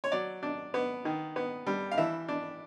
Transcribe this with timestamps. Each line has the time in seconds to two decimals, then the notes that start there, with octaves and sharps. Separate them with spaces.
0.04 C#5
0.12 F#3 D5
0.43 D4
0.74 B3
1.05 D#3
1.36 B3
1.67 G3
1.91 F5
1.98 E3 E5
2.28 D4